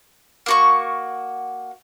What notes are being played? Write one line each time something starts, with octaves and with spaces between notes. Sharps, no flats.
A#3 F#4 C#6